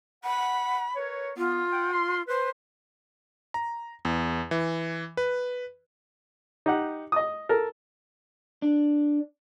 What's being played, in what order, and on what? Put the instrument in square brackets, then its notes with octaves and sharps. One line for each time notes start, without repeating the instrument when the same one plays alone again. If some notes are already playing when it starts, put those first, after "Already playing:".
[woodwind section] F#5 [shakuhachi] B5
[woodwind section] A#4 B4 C#5
[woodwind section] B3 [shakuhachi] F4
[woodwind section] F#5 G5
C6
[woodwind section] B4 [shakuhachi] C5
[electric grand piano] A#5
E2
E3
B4
[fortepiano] D#4 G4 F#5
D#5 D#6
A4 A#4
[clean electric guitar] D4